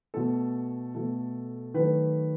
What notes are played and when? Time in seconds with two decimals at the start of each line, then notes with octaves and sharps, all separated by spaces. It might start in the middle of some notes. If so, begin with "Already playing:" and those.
0.14 B2 A3 A4
0.95 B2 A3
1.74 D#3 F#3 A3 B4